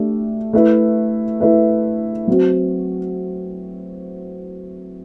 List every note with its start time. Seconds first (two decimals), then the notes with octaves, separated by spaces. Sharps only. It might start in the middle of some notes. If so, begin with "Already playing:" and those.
Already playing: A3 D4 G4
0.53 A3 E4 B4
1.41 A3 E4 B4
2.28 F#3 C4 F#4